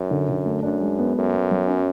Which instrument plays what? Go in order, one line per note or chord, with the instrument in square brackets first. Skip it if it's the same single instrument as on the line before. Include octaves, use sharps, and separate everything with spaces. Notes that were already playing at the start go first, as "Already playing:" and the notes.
Already playing: [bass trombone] F#2
[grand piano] D3
D3
A3
[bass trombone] F#2 [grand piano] D4
[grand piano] G#3
B3
[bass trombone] F#2 [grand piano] A4
[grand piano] B3
F#3
C#4